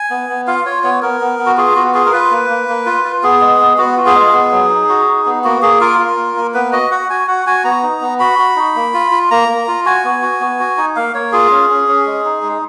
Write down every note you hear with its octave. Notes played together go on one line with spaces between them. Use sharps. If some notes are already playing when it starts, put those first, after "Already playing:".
Already playing: G#5
B3
B3
F4 F5
F4 C#5
B3 C#5
B3 A#4
B3
B3
F#4
F4 G#4
B3 F#4
F4 G#4
A#4
F4 B4
A#3
A#3
A#3
F4
F4
B3 G#4
G#3
B3
B3 F#4
F4
G#4
G#3
B3
F#3
D#4
F#4
D#4
B3
A#3 F#4
A#3 G#4
F4 A#4
F4
A#3
A#3
B3 B4
F#4 D#5
F#4 F#5
F#4 G#5
F#4 F#5
F#4 G#5
B3 A#5
D#4
B3
F#4 B5
F#4
D#4
A#3
F4
F4
A#3 A#5
A#3
F4
F#4 G#5
B3
F#4
B3
F#4
D#4
A#3 F5
A#3 C#5
F4 G#4
C#4
C#4
C#4
G#3
D#4
G#3